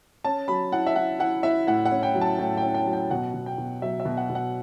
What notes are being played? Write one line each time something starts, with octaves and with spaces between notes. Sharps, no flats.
C#4 A5
F#3 B5
E4 F#5
E5
E4 F#5
E4 F#5
E4 E5
A2 F#5
F#5
C#4
G5
F#3
A5
A2 G5
C#4 G5
G5
F#3
G5
B2 F#5
B2
G5
B2
F#3 E5
E5
B2
F#5
B2
F#5